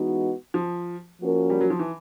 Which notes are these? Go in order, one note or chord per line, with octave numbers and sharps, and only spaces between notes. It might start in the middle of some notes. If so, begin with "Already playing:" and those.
Already playing: E3 G#3 B3 D#4 F#4
F3
F3 A#3 C#4 F#4 A#4
G3
F#3
F3
E3